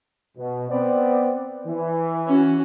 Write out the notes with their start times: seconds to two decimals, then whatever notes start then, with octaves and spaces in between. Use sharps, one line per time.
0.37 B2
0.69 B3 C4 D5
1.67 E3
2.27 C#4 F#4